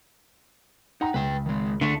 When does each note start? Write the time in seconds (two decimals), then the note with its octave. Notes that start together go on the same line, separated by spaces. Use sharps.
1.01 D#4 F#5 G5 A#5
1.14 C#2 B4 G5
1.46 D#3 G#3
1.81 D3 A3 D4